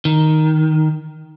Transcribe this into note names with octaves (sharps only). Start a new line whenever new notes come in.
D#3